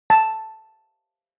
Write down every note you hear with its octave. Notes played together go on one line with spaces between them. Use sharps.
A5